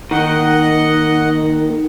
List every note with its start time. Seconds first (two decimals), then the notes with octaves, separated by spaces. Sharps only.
0.11 D#3 A#3 D#4 A#4 D#5 F#5